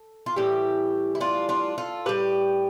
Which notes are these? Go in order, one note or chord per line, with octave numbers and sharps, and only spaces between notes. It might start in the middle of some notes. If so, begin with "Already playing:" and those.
Already playing: A4
F4
A2 E3 G3 E4 G4
E4
D4 F4
D4 F4
F4 A4
A2 G3 G4 B4